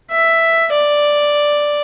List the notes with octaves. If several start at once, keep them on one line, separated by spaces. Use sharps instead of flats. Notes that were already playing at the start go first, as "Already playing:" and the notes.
E5
D5